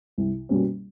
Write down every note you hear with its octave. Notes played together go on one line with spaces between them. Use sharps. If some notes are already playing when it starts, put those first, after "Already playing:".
C2
B2 G3 A#3 C#4